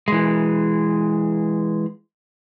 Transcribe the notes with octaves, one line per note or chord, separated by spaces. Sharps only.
E3 G#3